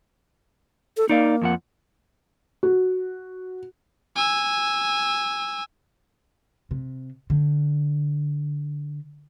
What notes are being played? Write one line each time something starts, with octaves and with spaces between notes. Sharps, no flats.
A4
A#3 D#4 D5 F5
F2 F3 F#5
F#4
G#5 E6
C3
D3